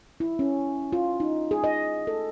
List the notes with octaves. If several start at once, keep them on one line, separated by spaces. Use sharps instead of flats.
E4
C#4
F4
D#4
G#4
D#5
A4